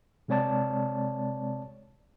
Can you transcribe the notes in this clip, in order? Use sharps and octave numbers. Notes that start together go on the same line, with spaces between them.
C3 G#3 C4 C#5 D5 A5